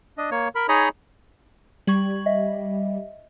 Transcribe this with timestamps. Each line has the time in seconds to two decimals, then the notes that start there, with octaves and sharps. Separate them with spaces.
0.18 D4 D#5
0.31 A#3 C#5
0.55 A#4 B5
0.69 D#4 G#4 C#5 D#5 A#5 B5
1.87 G3 C#6 G#6 F#7
2.26 D#5 E5